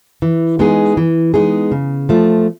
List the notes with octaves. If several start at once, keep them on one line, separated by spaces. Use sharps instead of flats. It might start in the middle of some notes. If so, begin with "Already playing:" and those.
E3
G#3 B3 D#4 G#4
E3
G#3 B3 D#4 G#4
C#3
F3 A3